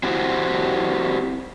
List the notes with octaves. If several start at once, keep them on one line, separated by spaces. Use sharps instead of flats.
C4 E4 F#4 G4 C5